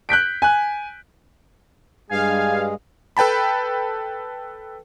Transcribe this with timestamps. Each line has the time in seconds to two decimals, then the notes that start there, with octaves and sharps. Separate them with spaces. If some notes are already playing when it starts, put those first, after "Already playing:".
0.09 F#6 G6 B6 D7
0.42 G#5 F#6
2.10 G2 G#3 G#4 F5 G#5
3.17 A4 B4 G5 A5 B5